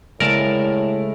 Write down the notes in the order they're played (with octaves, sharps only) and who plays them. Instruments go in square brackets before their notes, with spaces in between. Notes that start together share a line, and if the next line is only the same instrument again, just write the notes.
[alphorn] A2 [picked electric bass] C#3 G#3 A3 [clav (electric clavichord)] A#4 D5 A5